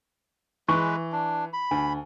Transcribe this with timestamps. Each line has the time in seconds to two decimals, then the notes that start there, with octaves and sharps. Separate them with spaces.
0.68 E3 G#3 B4 C#6
1.12 D4
1.53 B5
1.71 D2 G#5